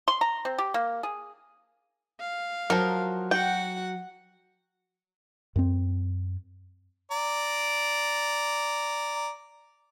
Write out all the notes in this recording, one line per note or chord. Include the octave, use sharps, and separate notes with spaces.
C6
A#5
C4
G4
A#3
G#4
F5
F3 F#3 A#4
F#4 F#5 G5
F#2 B3 C4
D5 A#5